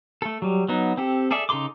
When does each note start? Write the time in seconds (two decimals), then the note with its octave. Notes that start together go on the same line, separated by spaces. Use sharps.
0.22 A3 A4
0.42 F#3 G3
0.68 F#3 B3 D#4
0.97 C4 G4 A4
1.31 G#4 A4 D5 E5
1.49 C#3 D#4 A4 C6 D6